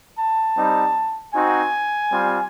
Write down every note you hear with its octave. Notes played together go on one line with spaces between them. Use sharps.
A5
G3 C4 D#4
C4 D#4 F#4 G#5
G3 C4 F4